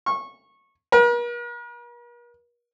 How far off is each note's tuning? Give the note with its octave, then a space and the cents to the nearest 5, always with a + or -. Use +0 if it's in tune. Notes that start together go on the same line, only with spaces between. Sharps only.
C#6 -20
A#4 +45